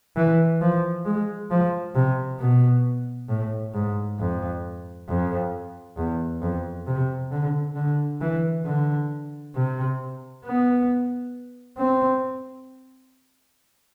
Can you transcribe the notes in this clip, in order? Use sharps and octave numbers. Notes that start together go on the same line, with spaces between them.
E3
F3
G#3
F3
C3
B2
A2
G#2
F2
F2
E2
F2
C3
D3
D3
E3
D3
C3
B3
C4